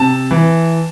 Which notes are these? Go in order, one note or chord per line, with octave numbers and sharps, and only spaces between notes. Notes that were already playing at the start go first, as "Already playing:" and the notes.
Already playing: C3 A5
E3